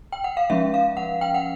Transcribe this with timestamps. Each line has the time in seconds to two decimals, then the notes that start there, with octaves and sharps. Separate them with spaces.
0.12 G5
0.24 F#5
0.37 F5
0.50 F3 G#3 C#4 E5
0.74 F5
0.97 F#5
1.21 G5
1.34 F#5